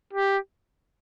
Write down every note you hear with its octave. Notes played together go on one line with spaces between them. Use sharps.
G4